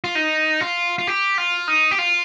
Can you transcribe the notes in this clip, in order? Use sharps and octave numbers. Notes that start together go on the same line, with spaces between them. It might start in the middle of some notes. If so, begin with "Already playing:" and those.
F4
D#4
F4
F4
G4
F4
D#4
G4
F4